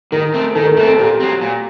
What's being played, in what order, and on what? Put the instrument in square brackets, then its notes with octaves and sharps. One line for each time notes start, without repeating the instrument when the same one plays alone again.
[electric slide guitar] D#3 [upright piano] A#4
[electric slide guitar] A3 C4
[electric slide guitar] D#3 [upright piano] A4
[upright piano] A#4
[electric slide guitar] A3 C4 [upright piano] A#4
[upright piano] A4
[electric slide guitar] A#2 [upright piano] G4
[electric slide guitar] F#3 C4
A#2